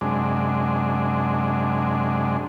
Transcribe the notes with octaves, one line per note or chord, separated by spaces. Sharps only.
F#2 C3 G#3 D4